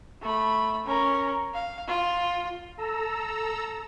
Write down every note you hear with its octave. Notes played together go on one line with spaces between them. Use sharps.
A3 B5
C#4 A#4
F5
F4
A4 A#5 E6